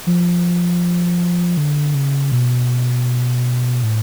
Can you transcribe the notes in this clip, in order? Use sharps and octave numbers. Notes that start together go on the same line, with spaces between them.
F3
D3
C#3
B2
A2